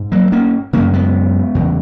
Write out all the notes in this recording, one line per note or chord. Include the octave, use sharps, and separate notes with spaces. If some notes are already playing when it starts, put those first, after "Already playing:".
Already playing: G#2
F#3 A#3
A#3 C#4
F#2 C#3 A#3 C#4
G#3 B3
E2 C#3